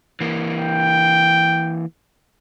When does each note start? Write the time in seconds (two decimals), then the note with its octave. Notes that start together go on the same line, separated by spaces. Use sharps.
0.21 E3 A#3
0.59 G5